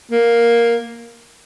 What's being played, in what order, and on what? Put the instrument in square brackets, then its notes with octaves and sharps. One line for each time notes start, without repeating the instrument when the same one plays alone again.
[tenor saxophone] A#3